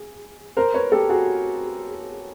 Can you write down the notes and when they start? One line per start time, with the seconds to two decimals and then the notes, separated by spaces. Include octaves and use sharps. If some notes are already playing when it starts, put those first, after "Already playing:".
Already playing: G#4
0.57 A#4 C5
0.74 B4 C#5
0.92 G4 A4
1.09 F#4 G#4